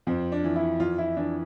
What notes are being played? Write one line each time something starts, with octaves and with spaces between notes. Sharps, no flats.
F2 C4
D4
E3
E4
F2 F4
E4
E3 D4